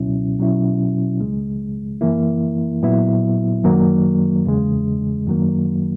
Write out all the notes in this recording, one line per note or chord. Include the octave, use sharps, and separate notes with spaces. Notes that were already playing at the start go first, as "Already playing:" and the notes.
Already playing: C#2 B2 F#3 C#4 E4
B2 F#3 C#4 E4
C#2 C#3 G#3
F#2 E3 A#3 E4
A#2 F#3 B3 E4
F#2 D#3 F#3 A#3
E2 C#3 G#3
F#2 D#3 F#3 A#3